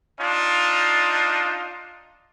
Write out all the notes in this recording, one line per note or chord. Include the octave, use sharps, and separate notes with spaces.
D4 D#4 F4